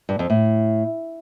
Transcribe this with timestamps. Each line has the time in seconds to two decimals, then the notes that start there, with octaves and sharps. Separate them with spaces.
0.09 G2
0.19 F2
0.30 A2